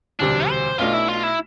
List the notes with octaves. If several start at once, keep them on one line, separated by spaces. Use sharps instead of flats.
E1 D2 C3 G3 C4 D4
C5
B1 B2 A3 D4 F4
E4
F4
E4